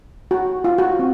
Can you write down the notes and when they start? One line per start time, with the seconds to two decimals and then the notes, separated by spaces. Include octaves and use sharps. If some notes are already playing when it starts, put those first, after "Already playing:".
0.31 F#4
0.64 F4
0.78 F#4
0.99 C4